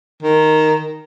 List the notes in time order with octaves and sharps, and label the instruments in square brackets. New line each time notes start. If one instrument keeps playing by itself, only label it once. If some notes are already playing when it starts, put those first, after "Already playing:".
[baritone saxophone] D#3